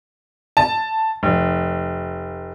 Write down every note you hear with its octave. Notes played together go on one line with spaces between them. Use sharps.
A5
F1